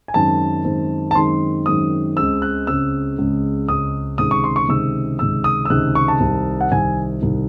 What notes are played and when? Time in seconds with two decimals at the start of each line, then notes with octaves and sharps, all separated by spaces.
0.08 G#5
0.14 F#2 D#3 G#3 C4 A5
0.65 F#2 D#3 G#3 C4
1.11 A5
1.15 F#2 D#3 G#3 C4 C6
1.66 F#2 D#3 G#3 C4 D#6
2.16 C#2 C#3 G#3 C4 E6
2.42 F#6
2.67 C#2 C#3 G#3 C4 E6
3.18 C#2 C#3 G#3 C4
3.69 C#2 C#3 G#3 C4 D#6
4.18 C#2 C3 D#3 G#3 D#6
4.31 C#6
4.44 C6
4.56 C#6
4.69 C#2 C3 D#3 G#3 E6
5.19 C#2 C3 D#3 G#3 E6
5.44 D#6
5.65 E6
5.70 C#2 C3 D#3 G#3 F#6
5.95 C#6
6.08 A5
6.20 C2 C3 D#3
6.61 F#5
6.71 C2 C3 D#3 G#5
7.22 C2 C3 D#3